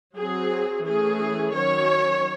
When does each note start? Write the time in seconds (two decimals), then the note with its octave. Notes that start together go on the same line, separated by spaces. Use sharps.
0.16 F#3 C4 G#4
0.85 E3 A3 C#4 G#4
1.54 D#3 F#3 C#4 C#5